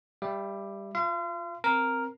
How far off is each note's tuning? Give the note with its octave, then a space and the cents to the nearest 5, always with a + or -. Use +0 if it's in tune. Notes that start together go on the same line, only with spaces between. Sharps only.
G3 +10 E5 +30 D6 +10
F4 +5 F5 -40 C6 -35
C4 +0 A#4 +0